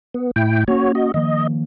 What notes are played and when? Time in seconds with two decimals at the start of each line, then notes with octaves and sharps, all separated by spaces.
0.14 B3
0.36 A2 E4 G5
0.68 A#3 C#4 F#4 C#5
0.95 F#4 D#5
1.14 D#3 F3 A#3 D#5